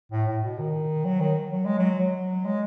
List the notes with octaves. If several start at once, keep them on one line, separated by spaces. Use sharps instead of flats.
A2
A2
B2
D#3
F#3
D#3
F#3
G#3
F#3
F#3
G#3